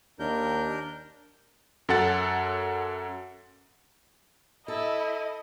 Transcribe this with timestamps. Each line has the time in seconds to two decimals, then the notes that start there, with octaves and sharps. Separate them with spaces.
0.19 D#2 D4 A#4 G6
1.89 F#2 A4 F#5 A6
4.68 E4 A4 D#5